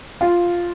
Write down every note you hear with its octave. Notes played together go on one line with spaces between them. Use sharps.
F4